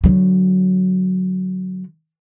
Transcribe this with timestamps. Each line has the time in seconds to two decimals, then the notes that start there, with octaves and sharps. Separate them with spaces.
0.04 D3 F#3